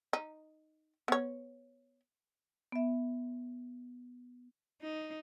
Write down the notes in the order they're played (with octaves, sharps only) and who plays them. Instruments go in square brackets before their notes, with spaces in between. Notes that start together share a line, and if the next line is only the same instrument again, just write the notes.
[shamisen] D#4
B3 C#5
[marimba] B3 E5
[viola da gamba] D#4